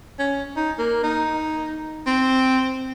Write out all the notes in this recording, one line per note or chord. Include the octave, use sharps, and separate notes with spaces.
C#4
D#4
A#3
D#4
C4